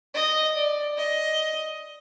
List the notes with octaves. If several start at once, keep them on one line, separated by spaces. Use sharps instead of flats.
D#5
D5
D#5